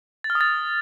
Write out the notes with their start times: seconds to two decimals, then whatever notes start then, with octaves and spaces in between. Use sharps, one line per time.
0.24 A6
0.30 F6
0.35 D#6
0.41 A6